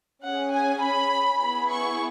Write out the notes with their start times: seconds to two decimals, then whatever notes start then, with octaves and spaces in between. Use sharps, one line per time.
0.24 C#4 G#4 F#5
0.53 G#5
0.83 B5
1.41 B3 E4 G#4 B5
1.71 C#6